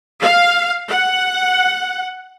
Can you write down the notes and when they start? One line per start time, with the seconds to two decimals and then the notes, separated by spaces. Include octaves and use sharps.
0.20 F5
0.89 F#5